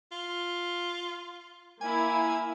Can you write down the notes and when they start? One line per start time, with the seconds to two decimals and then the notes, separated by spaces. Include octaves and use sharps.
0.12 F4
1.81 A#3 E4 G#5